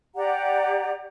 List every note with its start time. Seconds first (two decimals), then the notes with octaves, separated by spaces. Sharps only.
0.15 G4 D5 F#5 A#5